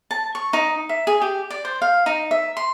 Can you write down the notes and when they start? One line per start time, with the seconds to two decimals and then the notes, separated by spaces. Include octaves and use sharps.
0.11 A5
0.35 C#6
0.53 D#4
0.89 E5
1.07 G#4
1.21 G4
1.50 D5
1.65 C5
1.82 F5
2.06 D#4
2.31 E5
2.57 C6